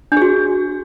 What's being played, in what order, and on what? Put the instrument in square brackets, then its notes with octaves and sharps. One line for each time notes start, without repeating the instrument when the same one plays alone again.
[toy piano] D4
G#4
F#4